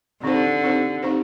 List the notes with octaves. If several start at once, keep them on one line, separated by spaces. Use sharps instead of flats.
D3 C4 D#4 G4 C5
C4 D#4 G4 C5
C4 D#4 G4 C5